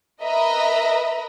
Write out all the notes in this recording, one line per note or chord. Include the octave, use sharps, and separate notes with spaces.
A#4 B4 D#5 E5 A#5 B5